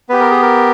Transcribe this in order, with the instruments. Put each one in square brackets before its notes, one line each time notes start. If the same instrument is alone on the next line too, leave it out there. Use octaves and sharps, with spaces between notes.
[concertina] B3 G4 B4
A#4
G#4
A#4